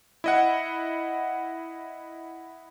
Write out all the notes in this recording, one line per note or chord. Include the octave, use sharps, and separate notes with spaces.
E4 D#5 F#5